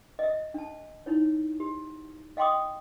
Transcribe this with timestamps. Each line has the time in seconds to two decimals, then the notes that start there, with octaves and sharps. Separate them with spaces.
0.19 D#5 E5
0.54 D4 A5
1.06 D#4 E4 C#5
1.60 G4
2.37 D#5 F5 G5 C6 D6 D#6